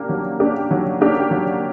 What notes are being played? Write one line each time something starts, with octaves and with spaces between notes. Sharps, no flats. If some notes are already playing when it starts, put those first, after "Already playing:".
Already playing: A#3 D4 G4
F#3
A#3 D4 G4
F#3
A#3 D4 G4
F#3